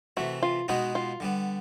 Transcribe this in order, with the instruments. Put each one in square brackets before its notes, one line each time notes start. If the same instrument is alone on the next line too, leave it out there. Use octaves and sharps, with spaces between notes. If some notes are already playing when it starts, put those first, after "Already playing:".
[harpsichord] C3 E3 A3 [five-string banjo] F#4
[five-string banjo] F4
[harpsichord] B2 G#3 B3 D#4 G#4 [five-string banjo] F#4
[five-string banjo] F4
[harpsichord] D3 G3 B3